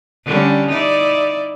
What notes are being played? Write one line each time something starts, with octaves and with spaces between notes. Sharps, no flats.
D3 G3 C#4
D#4 E4 D5